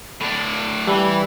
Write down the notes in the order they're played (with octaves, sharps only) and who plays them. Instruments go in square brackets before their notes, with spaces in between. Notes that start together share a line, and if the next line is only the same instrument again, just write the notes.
[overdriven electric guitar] A2 D4
[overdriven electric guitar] E3 [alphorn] G3